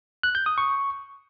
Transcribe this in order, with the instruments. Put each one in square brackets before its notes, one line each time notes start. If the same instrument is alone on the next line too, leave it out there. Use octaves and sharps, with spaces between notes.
[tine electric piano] F#6
G6
D#6
C#6